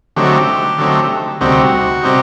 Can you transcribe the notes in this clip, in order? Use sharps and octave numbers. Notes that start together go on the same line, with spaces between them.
D3 F#3 A3 C4 D#4 G4
F#4
G4
D3 F#3 A3 C4 D#4
D2 C3 G3 C4 D#4 F#4
C3 G3 C4 D#4